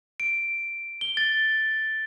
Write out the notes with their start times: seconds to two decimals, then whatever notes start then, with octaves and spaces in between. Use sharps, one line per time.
0.20 D7
1.01 G7
1.17 A6